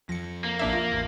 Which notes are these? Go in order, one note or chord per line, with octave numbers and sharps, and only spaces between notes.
F2 F3 A#6 C#7
A#3
A#1 D4 E5
F4
A1 E2